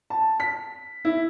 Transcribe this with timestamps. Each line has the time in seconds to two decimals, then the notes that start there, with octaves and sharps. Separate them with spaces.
0.10 A5
0.40 B6
1.05 E4